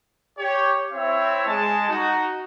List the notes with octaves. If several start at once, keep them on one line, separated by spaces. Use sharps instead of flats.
G4 C#5
C4 E4 C#5 E5
G#3 A5
D#4 F#4